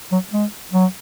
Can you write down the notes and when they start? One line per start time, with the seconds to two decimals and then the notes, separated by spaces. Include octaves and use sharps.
0.12 F#3
0.32 G#3
0.73 F#3